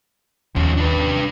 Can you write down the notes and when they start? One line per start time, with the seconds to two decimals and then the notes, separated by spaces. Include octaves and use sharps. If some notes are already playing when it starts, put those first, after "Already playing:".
0.56 D#2 F3 C#4
0.77 D4 B4
0.98 C3